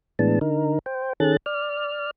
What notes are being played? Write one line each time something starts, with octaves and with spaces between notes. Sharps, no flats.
A2 E3 G#3 B3 D4 A5
D3 D#4 A#4
C5 G5
D#3 C#4 G#4 A4 F#6 A6
D5 F6